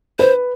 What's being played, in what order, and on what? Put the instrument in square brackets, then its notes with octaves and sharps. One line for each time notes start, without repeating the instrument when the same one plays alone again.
[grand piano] B4 [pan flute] C5